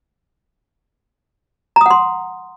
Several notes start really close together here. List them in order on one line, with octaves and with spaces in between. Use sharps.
A#5 D#6 F#5 C6